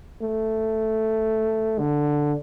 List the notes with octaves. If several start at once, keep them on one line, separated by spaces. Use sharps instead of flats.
A3
D3